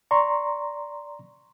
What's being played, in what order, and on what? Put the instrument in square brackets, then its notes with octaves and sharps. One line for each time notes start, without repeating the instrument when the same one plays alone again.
[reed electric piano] D5 A#5 C6 C#6